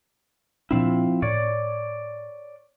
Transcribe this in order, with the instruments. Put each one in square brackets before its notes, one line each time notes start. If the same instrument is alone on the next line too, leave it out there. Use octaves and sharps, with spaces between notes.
[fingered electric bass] A#2 D4 [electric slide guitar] F3 C4 E4
[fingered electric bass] A2 [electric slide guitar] C#5 D5